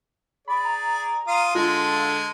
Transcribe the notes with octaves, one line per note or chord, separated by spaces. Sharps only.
G#4 D5 B5
A#5
F4 F5 D#6
D3 G#3 F4 A4